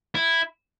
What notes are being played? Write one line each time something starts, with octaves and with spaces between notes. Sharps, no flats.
E4